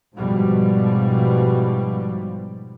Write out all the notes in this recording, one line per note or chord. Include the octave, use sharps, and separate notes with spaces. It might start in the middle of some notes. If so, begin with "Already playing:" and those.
G#2 B2 F3 G3